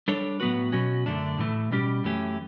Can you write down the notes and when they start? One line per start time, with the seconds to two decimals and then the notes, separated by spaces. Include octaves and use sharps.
0.08 G3 D4 A4 C#5
0.40 A2 F#3 B3 F#4 B4
0.72 B2 F#3 C#4 F#4
1.06 F#2 D3 A3 D4
1.38 A2 E3 A3
1.71 B2 G3 C#4 G4
2.04 F#2 E3 A3 C#4 G4